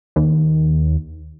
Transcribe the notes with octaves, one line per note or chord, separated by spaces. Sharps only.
D#2